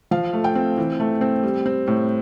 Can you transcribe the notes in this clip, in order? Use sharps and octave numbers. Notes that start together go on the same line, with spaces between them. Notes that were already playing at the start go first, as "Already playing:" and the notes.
F3 F5
A3
G5
C4
E3
A3
C4
G3
C4
A2